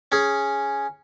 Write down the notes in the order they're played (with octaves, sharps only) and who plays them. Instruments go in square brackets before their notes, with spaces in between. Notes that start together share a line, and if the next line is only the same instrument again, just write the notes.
[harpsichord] C#4 G#4